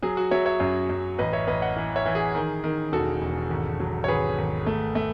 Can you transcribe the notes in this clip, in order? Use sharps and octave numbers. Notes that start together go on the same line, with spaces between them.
F#3 G#4
F#4
F#3 C#5 E5
C#5 E5
F#2
F#2
A1 B4 D#5
C#5 E5
A1 B4 D#5
D#5 F#5
E3
C#5 E5
E3
G#4
D#3
D#3
E1 F#4 A4
E1
G#1
F#3
C#5
G#1 G#4 B4
G#1
A3
A3